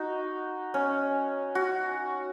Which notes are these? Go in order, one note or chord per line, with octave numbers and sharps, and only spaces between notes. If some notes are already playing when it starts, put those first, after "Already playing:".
Already playing: D#4 F#4
C#4
F#4